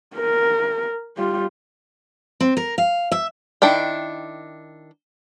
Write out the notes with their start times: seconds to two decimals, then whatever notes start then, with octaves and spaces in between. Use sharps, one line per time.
0.16 A#4
1.17 G3 F4
2.40 C4
2.57 A#4
2.78 F5
3.12 E5
3.62 D#3 D4 E4 G5